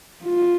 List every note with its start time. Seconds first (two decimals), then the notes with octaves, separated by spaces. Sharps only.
0.24 F4